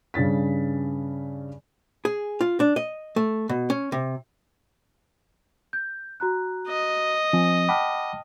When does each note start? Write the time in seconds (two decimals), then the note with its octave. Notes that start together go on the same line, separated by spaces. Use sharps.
0.14 G2 C#3 C#4 A6 B6
2.05 G#4
2.41 F4
2.60 D4
2.76 D#5
3.16 A3
3.49 B2
3.70 C#4
3.92 C3
5.73 G6
6.20 F#4 A#5 F#6
6.68 D#5
7.33 F3 C4 G#5
7.69 F#5 G5 A5 B5 D6 F6